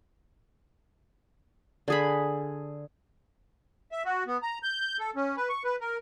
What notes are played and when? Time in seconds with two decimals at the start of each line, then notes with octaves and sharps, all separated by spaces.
1.88 D3 G#4 B5
3.92 E5
4.05 F#4
4.27 B3
4.42 A#5
4.63 G6
4.99 A4
5.16 C#4
5.36 B4
5.49 C#6
5.64 B4
5.81 A#4